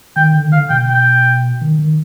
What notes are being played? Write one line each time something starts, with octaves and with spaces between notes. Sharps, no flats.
D#3 G5
D3
D#3
D3 F5
B2 G5
G5
D#3
D#3